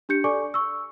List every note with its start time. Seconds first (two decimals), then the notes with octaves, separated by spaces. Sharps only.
0.09 D4 G4 G6 C#7
0.24 A4 D5 G#5 C#6 D6
0.54 C#6 E6